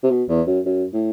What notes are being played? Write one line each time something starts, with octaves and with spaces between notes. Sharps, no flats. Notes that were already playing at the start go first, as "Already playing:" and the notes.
C3
B2
E2
F#2
F#2
A2